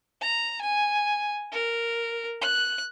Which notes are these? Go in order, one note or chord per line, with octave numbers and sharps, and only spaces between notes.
A#5
G#5
A#4
F#6